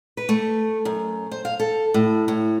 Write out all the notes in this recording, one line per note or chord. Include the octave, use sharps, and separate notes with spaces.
B4
A3
F#2
C5
F5
A4
A2
A2